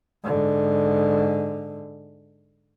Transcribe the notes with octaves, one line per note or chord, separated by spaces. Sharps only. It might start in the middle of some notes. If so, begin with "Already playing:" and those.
G#2 D3